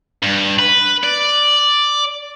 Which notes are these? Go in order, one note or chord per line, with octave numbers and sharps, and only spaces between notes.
G2
B4
D5